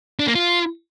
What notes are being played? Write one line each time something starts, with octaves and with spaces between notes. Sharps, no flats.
D4
A#3
F4